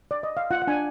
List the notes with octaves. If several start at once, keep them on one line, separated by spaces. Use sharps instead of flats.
D5
D#5
F5
F4 F#5
F#5
D4 G#5